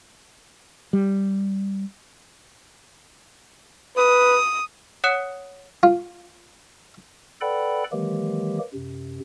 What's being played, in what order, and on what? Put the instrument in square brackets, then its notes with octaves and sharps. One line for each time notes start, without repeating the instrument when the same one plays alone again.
[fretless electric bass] G3
[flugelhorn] B4 [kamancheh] D#6
[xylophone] C#5 F#5 D#6 F#6 C#7 E7
[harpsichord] F4
[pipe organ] A4 B4 D5 F#5 G5 B5
D#3 E3 F#3 G#3 A#3 G4
F#2 C3